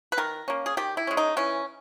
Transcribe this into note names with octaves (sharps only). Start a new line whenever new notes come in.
B4
D#3 A#4
A#3 C#4
G#4
D#3 G4
E4
G#3 C#4
D#4
E3 C#4